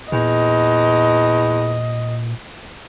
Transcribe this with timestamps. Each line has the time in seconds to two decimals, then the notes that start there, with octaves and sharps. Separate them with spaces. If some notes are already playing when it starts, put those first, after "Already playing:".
0.12 E2 A#2 D#5